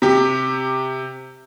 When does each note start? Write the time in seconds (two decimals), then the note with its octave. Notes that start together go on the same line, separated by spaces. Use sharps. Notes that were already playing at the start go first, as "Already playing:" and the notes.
0.02 C3 G4